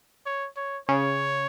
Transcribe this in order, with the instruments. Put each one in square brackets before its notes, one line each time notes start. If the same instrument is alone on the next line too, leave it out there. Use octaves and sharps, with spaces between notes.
[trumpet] C#5
C#5
[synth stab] C#3 [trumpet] C#5